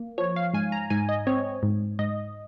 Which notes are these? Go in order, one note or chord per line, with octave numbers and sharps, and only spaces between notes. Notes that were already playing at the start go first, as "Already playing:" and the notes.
Already playing: A#3
F3 C#5
F5
G#2 G#5
A#5
G#2 G#5
D#5
C4 C#5
G#2
G#2 D#5